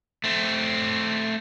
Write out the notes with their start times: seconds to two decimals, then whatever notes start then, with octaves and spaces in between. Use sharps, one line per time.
0.24 A3 C4